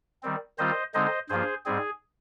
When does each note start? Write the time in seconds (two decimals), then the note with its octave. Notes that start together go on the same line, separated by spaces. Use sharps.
0.23 D#3 G3 C4
0.58 D#3 G3 C4 F4 C5 D#5
0.94 D3 G#3 C4 D#4 C5 D#5
1.30 G2 F3 A#3 F4 G#4 C5
1.65 G#2 G3 C4 G#4